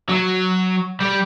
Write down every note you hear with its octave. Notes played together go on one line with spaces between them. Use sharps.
F#3
G3